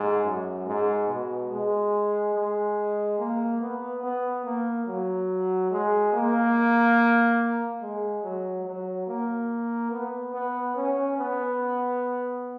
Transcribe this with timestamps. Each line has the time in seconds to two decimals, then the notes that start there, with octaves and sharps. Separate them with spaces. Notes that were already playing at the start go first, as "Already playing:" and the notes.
Already playing: G#2
0.25 F#2
0.66 G#2
1.08 B2
1.51 G#3
2.35 G#3
3.19 A#3
3.61 B3
4.03 B3
4.45 A#3
4.87 F#3
5.71 G#3
6.13 A#3
7.81 G#3
8.24 F#3
8.65 F#3
9.07 A#3
9.92 B3
10.34 B3
10.76 C#4
11.18 B3